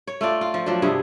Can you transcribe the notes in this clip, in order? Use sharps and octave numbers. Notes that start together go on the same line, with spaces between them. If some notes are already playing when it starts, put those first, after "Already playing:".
C#5
A3 F4 D5
F4
F3
F3 F#3 D4
G2 C3 B3 G#4